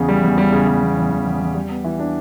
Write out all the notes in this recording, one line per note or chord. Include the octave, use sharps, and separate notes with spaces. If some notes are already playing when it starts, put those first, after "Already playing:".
Already playing: E2 C#3
G3
E2
G3
C#3
G3
E2
E2
E2
E2
E2
G3
B3
E3
D4